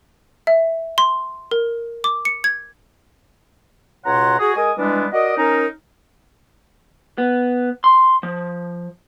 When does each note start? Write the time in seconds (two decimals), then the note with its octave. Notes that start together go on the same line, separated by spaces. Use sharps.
0.47 E5
0.98 C6
1.51 A#4
2.04 D6
2.25 C#7
2.44 G#6
4.05 C#2 B2 C#5 F#5 A#5 C6
4.40 F#4 G#4
4.56 G#3 A#4 G#5 D#6
4.77 E3 G3 G#3 B3 D4
5.12 F#4 A#4 D5 D#5
5.37 C#4 D#4 A#4
7.18 B3
7.84 C6
8.23 F3